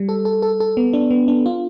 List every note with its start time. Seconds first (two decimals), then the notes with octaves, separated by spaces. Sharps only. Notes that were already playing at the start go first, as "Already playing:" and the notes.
Already playing: G3
0.09 A4
0.25 A4
0.42 A4
0.60 A4
0.77 B3
0.93 D4
1.11 B3
1.28 D4
1.46 F4